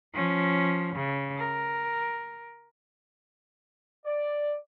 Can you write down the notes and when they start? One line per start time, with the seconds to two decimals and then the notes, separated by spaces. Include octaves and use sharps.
0.13 F3 C#4
0.95 C#3
1.38 A#4
4.06 D5